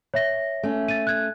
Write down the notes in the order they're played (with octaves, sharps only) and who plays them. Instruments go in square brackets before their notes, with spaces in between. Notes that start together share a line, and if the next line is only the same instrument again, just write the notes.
[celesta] C#5 E5 A#6
[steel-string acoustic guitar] A3 C#4
[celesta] A6 D#7
F#6 G#6